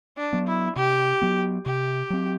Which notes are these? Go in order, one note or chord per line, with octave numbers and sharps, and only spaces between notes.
D4
F#3 B3
E4
C3 G4
F#3 B3
C3 G4
F#3 C4